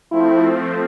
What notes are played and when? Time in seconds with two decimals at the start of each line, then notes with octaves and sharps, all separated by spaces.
0.11 F3 A3 C4 E4